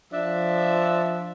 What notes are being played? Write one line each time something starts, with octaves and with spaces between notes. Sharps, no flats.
F3 D4 E5